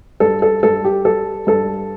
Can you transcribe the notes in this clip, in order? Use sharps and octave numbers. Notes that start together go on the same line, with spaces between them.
G2 A4
A4
G2 A4
G4
G3 A4
G2 A4